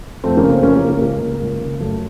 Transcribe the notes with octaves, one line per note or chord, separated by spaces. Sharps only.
F2 A3 C4
A#3 C#4
C#3
A3 C4
F2 A#3 C#4
A#3
C#3
A#3
C#2 A#3
C#3
C#2
C#3
F#2 A3